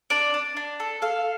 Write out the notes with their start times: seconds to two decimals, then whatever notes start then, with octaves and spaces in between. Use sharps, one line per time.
0.10 D4 D5
0.34 D4
0.57 D4
0.80 A4
1.02 A4 F5